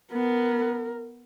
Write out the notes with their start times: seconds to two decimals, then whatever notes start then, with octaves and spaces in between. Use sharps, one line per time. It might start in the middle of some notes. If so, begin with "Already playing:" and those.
0.13 B3 A#4